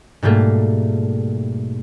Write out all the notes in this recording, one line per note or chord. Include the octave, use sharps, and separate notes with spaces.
G#2 B2 G3 A3 A#3